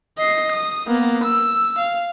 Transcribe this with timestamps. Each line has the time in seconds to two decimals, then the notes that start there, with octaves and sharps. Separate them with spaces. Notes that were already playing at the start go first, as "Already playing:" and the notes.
0.19 D#5 C7
0.52 D#6
0.88 A#3 B3
1.23 E6
1.78 F5